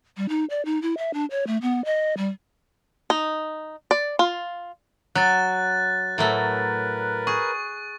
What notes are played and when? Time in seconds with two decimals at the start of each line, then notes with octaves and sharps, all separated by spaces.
0.17 G3
0.29 D#4
0.50 D5
0.65 D#4
0.82 E4
0.98 E5
1.14 D4
1.31 C#5
1.47 A3
1.62 B3
1.85 D#5
2.17 G3
3.10 D#4
3.91 D5
4.19 F4
5.15 F#3 F#6 A6
6.18 A2 F#3 A3 A#4 B4
7.27 G#4 C#6